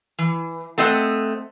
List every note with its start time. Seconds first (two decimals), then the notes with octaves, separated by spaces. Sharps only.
0.19 E3
0.78 A3 C4 D#5 E5 F#5